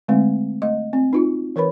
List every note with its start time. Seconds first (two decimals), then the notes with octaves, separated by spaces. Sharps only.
0.08 D3 G#3 A3 C4
0.62 A3 D#5
0.93 C4
1.13 D#4 F4 F#4
1.56 E3 A#4 B4 C#5 B5